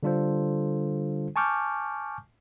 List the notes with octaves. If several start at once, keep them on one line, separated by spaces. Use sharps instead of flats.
D3 G3 D4 F4 A4 C5
G#5 A5 C#6 D6 F6 G6